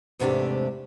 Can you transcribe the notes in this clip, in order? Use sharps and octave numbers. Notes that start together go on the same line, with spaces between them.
E2 G#2 C3 A3 D4 G4